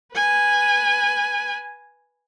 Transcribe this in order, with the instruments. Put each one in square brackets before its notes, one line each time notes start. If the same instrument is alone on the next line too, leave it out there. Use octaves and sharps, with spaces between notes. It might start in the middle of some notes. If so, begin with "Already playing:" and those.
[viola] B4 G#5